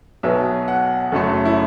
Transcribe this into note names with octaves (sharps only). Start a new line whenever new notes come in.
B1 B2 F#3 B3 E5
F#5
F#1 F#2 F#3 A3 A4
E4